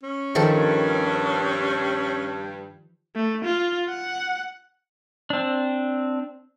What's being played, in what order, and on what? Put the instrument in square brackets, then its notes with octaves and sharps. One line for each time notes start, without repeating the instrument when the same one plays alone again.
[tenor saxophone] C#4
[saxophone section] G2 [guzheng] D#3 F3 A4
[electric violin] A3
F4
F#5
[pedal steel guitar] C4 D4